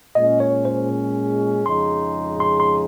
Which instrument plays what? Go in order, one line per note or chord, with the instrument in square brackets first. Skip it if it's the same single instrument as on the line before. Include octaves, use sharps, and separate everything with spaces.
[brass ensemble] A#2 G#3 C#4 [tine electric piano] D#5
[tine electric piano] C#5
C5
[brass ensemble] F2 C#3 G#3 D#4 [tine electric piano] C6
[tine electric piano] C6
C6